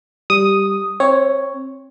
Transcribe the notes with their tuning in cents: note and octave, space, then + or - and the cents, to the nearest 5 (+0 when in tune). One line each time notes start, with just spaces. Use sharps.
G3 +0 D#6 +0
C4 +25 C#5 +0